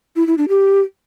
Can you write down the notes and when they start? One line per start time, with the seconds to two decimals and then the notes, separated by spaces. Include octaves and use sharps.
0.16 E4
0.27 E4
0.38 D4
0.49 G4